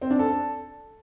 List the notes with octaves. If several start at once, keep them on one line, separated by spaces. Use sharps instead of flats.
C4
D4
A4